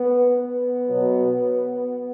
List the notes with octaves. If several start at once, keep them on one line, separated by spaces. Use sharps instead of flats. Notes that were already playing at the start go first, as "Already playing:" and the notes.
Already playing: B3
B3
B2 F#3